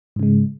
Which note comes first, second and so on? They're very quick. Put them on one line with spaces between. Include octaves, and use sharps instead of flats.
G#2 C#3 G#3